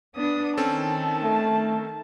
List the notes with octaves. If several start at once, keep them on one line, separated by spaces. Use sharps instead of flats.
B3 D4 D#6
D#3 C4 C#4 A4 A5
A3